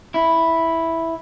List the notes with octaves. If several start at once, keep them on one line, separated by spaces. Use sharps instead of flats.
E4